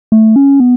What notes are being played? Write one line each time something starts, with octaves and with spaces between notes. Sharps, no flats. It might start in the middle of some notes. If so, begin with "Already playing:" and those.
A3
C#4
B3